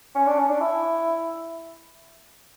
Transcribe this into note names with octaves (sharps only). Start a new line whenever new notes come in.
C#4
D4
C#4
D4
E4